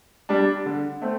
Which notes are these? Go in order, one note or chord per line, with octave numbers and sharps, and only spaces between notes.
G3 D4
D3
A3 C4